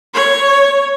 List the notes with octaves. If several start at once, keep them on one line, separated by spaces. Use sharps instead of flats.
C#5